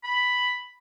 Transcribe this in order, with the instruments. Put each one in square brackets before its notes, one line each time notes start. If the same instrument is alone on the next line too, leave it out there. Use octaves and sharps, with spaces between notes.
[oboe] B5